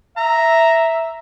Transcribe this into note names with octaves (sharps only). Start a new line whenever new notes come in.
E5 A#5